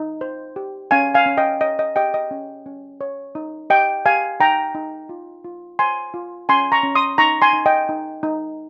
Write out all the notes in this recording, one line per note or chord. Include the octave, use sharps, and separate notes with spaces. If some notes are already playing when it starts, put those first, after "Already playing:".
Already playing: D#4
C5
G4
C#4 F5 G#5
F5 G#5
C#4
D#5 G5
C#5 D#5
D#5
G4 D#5 G5
D#5
C#4
C#4
C#5
D#4
G4 D#5 G5
G4 F5 G#5
D#4 G5 A#5
D#4
F4
F4
C5 G#5 C6
F4
C#4 G#5 C6
A#5 C#6
C#4
C6 D#6
D#4 A#5 C#6
G#5 C6
D#4
D#5 G5
D#4
D#4